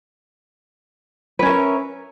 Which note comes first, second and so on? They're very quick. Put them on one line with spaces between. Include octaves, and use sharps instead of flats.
B4 C#4 A#4 E5